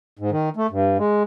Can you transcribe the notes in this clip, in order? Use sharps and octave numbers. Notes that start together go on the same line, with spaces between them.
G#2
D#3
A3
G2
G#3